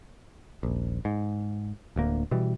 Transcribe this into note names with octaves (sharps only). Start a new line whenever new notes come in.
D#1 A#1
G#2
D1 D2 A#3
B2 E3 G3